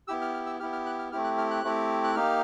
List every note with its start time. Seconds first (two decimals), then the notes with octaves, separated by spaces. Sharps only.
0.08 B3 E4 G4 E6
0.22 F6
0.34 F6
0.46 E6
0.60 B3 E4 G4 F6
0.72 F6
0.86 F#6
0.99 F6
1.12 A3 C4 E4 G4 F6
1.24 F#6
1.38 F6
1.51 F#6
1.64 A3 C4 E4 G4
2.04 F#6
2.15 A#3 D#4 G4 F6